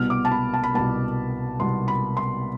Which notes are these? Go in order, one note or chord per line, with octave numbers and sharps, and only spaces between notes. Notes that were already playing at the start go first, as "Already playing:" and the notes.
Already playing: C2 B2 B3 F6
D6
A5
B5
A5
B5
C2 B2 B3 A5
C2 B2 B3 C6
B5
C6